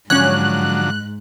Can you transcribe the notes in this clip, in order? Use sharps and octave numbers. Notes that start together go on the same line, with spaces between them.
G#2 D3 F3 F#3 C#4 C#5 F#6